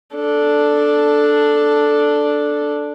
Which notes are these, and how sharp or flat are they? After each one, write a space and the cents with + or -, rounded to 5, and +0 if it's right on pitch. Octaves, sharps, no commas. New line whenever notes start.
D4 +0 A4 +0